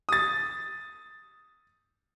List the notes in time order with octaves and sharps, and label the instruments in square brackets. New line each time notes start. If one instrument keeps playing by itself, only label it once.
[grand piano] D#6 A6